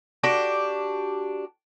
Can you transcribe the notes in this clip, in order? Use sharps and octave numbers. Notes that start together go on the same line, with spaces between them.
D4 F#4 G4